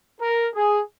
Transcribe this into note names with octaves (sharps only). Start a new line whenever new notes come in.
A#4
G#4